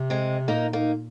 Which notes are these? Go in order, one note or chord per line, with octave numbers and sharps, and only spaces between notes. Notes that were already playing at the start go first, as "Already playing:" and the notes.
Already playing: C3
G#3 C4
A#2 A#3 D#4
A#3 D#4